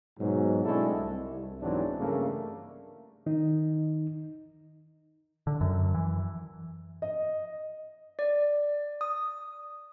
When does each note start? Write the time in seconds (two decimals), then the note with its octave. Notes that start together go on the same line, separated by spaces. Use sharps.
0.19 G#2 B2 F#3
0.65 G#3 A3 C4 D4 E4 A4
0.95 C2
1.60 E2 G#2 E3 F#3 C4 D4
1.98 G2 C#3 G3 A3 A#3
3.26 D#3 D#4
5.47 D3
5.61 F#2
5.95 E3
7.02 D#5
8.19 D5
9.01 D#6